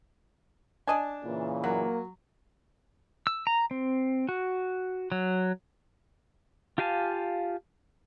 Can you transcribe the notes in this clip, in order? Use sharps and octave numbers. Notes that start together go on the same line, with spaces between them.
D4 D5 D#5 G#5 A5
A#2 C#3 E3
F#3 A#3 F#4
E6
A#5
C4
F#4
F#3
F4 G4 F5 G#5 A5